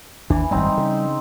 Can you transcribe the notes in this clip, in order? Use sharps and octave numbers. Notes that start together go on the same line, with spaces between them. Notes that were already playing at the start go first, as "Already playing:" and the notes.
G#1 D#2 E3 D4
G#1 F#2 G3 C4 D#4
C#3